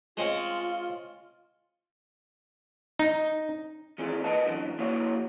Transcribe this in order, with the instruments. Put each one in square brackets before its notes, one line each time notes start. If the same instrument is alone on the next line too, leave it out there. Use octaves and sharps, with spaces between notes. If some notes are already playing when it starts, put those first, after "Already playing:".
[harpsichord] G#3 C4 C#4 [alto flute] F4
[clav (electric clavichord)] D#4
[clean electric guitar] D#3 E3 C4 F4 G#4
A#4 B4 D#5 F#5 A5
F#2 D3 E3 F3
F3 A#3 E4 F#4 C#5 F#5